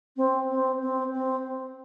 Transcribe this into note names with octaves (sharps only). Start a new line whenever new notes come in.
C4
C4
C4
C4